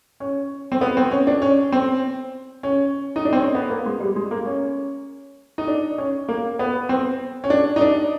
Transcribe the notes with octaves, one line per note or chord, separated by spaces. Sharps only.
C#4
C4
B3
C4
C#4
D4
C#4
C4
C#4
D#4
D4
C4
C#4
B3
A#3
G#3
G3
G#3
A#3
C#4
D#4
D4
C#4
A#3
B3
C4
C#4
D4
D#4
D4